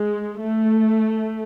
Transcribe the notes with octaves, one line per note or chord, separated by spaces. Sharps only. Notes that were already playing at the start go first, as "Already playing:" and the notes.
Already playing: G#3
A3